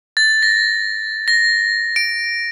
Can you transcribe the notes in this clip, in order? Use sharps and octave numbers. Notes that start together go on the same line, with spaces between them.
A6
A#6
A#6
D7